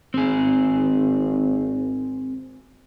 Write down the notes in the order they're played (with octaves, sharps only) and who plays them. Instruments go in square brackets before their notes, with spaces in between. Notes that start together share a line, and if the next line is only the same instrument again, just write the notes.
[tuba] G#1 [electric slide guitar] C4 G#4